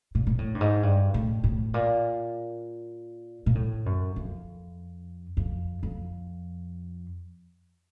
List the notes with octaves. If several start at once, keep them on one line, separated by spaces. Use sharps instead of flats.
A#2
A#2
A2
G2
G#2
G2
A2
A2
A#2
A#2
A2
F#2
F2
F2
F2